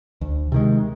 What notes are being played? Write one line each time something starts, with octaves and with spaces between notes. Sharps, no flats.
D2
C3 D#3 G#3